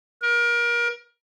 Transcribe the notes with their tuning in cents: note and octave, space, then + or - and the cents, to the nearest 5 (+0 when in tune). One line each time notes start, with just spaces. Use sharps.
A#4 +30